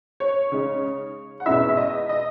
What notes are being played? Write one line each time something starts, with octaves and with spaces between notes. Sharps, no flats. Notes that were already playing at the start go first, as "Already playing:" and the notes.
C#5
C#3 G#3 D#4
F#5
E2 B2 G#3 C#4 E4 E5
E5
D#5
D#5